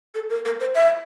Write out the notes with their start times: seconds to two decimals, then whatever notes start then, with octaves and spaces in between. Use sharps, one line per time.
0.15 A4
0.30 A#4
0.45 A#4
0.60 C5
0.75 E5